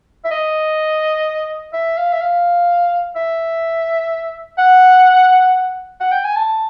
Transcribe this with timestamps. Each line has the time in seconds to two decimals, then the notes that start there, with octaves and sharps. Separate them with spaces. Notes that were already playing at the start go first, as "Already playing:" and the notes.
0.24 E5
0.31 D#5
1.73 E5
1.97 F5
2.13 E5
2.21 F5
3.16 E5
4.58 F#5
6.00 F#5
6.12 G5
6.24 G#5
6.36 A5